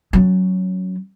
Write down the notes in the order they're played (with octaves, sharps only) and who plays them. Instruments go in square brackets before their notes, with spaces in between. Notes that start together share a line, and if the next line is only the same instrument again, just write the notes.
[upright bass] F#3 C#4